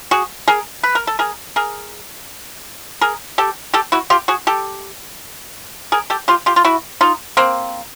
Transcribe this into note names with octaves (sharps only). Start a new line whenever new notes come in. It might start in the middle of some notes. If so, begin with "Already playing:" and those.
F#4 G#4
G#4 A#4
B4
A#4
A4
G#4 A#4
G#4 A#4
G#4 A#4
G4 A4
G4 A4
E4 F#4
F4 G4
F#4 G#4
G4 A4
G#4 A#4
G4 A4
F4 G4
F4 G4
F4
E4 F#4
D#4 F4
A#3 C4